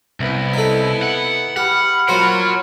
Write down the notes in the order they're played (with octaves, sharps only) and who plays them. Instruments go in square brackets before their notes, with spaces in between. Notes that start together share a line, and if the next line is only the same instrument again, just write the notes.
[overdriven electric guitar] C2 [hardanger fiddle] B3 E4
[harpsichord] D#4 A4
[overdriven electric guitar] F#5
[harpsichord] G4 [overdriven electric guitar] F#5 [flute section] B5 F6
[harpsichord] F#3 F#4 C5 [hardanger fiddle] A#3 F4 [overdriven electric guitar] C#5 F#5